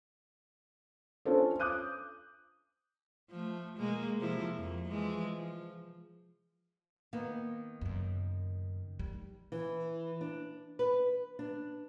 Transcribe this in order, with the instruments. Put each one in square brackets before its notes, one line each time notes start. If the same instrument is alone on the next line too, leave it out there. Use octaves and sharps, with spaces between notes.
[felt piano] C#4 D4 F4 A4 C5
D6 D#6 F#6 G6 D#7
[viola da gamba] F3 A3
B2 G#3 A#3
C3 F3 E4
F2 A#3
E3 F3 G#3
F3
[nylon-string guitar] D#3 A#3 B3
[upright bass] F#2 C#3
G3
[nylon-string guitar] E3
D4
B4
D4